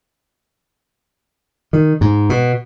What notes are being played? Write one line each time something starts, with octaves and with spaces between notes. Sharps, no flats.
D#3
G#2
B2